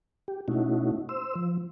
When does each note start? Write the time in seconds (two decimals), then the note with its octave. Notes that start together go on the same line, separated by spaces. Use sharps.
0.28 G4
0.48 B2 A3 C#4 D#4 E4 F#4
1.09 C5 E6
1.35 F3